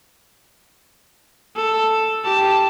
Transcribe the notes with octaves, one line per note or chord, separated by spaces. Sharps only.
A4
G4 A5